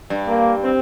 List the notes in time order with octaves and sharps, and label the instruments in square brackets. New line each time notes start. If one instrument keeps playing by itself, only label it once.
[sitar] G2
[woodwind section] A#3
C4